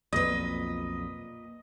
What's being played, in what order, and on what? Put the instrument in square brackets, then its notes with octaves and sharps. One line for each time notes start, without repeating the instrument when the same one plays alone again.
[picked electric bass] B1 F2 [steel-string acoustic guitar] A#2 B4 [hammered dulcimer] D#5